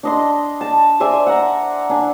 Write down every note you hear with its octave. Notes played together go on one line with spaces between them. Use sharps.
D4 D#5 C6
A5
C5 D5 E5 G#5
F#5 A#5
D4 G#5